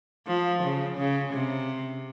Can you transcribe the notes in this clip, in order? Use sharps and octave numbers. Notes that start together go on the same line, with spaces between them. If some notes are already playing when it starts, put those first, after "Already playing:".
F3
C#3
C#3
C3